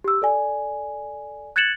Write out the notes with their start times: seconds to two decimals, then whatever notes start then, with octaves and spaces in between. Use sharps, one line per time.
0.04 G4 E6
0.22 A4 D5 G#5
1.56 F#6 G#6 A6 C#7 E7 F#7